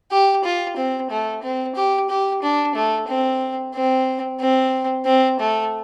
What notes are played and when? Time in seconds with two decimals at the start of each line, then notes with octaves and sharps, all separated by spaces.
0.11 G4
0.44 F4
0.77 C4
1.10 A3
1.43 C4
1.75 G4
2.09 G4
2.42 D4
2.75 A3
3.08 C4
3.74 C4
4.40 C4
5.05 C4
5.39 A3